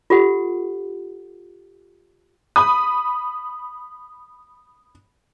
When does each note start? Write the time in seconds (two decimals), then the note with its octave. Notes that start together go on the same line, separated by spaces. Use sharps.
0.10 F4 G4 A4 F#5
2.56 B5 D#6